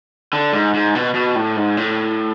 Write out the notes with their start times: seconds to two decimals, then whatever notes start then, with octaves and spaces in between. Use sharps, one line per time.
0.33 D3
0.53 G#2
0.74 G#2
0.95 B2
1.14 B2
1.35 A2
1.56 G#2
1.77 A2